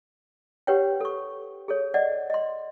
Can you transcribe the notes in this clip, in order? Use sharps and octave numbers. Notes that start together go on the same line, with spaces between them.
G4 B4 C#5 F#5 G5
A4 C#6
G#4 A4 C#5
D5 D#5 F#5
D#5 C6